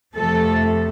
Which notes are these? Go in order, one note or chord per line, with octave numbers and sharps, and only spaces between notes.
F2 C3 F3 A3 A4